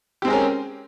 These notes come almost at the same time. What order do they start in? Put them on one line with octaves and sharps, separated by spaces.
G4 C4 G#3 A#4 C#4